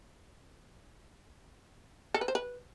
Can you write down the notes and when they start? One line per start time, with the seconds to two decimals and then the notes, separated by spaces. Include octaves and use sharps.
2.14 A4
2.21 B4
2.28 C5
2.35 B4